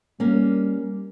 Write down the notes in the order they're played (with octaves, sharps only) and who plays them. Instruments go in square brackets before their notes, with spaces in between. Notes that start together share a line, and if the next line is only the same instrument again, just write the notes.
[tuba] G3 [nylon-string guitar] A#3 C#4